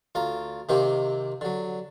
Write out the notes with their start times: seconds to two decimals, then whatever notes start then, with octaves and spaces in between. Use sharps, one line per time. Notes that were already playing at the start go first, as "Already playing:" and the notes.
0.15 D2 F4 A#5
0.69 C3 D#3 A#3 C4 G4
1.41 D3 F#3